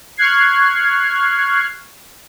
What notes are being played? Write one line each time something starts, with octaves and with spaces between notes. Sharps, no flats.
C#6 F6 F#6 G#6 C7